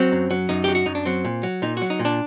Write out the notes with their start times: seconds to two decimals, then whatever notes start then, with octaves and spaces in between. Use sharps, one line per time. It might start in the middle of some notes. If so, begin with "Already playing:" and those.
Already playing: F#3 C4
0.12 F#2
0.31 F#3
0.49 F#2 D#4
0.64 F#3 G4
0.75 F#4
0.86 F#2 D#4
0.95 D4
1.05 F#3 C4
1.25 A#2
1.43 F#3
1.62 A#2 D#4
1.77 F#3 F#4
1.90 D#4
1.99 A#2
2.05 D4